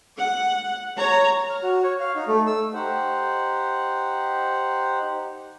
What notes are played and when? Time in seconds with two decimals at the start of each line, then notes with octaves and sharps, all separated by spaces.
0.18 F#5
0.97 C#5 A#5
1.50 F6
1.63 F#4
1.83 C#5
2.00 F5
2.15 D#4
2.28 A3
2.47 E6
2.74 D#4 G4 C5 F#5